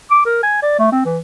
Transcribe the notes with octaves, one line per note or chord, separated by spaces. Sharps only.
D6
A#4
G#5
D5
A3
C4
E3